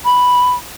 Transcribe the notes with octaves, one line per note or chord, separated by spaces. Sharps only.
B5